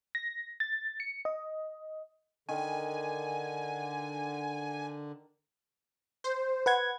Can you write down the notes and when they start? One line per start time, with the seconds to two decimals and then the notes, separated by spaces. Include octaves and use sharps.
0.15 A#6
0.60 A6
1.00 C#7
1.25 D#5
2.49 D3 D#3 G#5
6.24 C5
6.66 B4 F#5 G#6